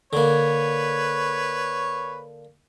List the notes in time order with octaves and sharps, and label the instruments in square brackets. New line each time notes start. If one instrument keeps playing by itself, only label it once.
[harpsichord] D3 A#3 [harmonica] B4 C#5